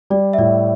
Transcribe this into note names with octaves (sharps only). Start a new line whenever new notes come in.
G3 D5
E5
A2 D5